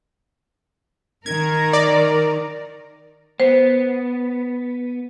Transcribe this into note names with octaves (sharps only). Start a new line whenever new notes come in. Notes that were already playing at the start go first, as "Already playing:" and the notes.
D#3 A#4 G#6
D5
B3 C5